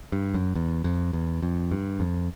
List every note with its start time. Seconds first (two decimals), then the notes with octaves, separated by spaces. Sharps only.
0.12 G2
0.34 F#2
0.55 E2
0.84 F2
1.13 E2
1.42 F2
1.71 G2
2.00 F2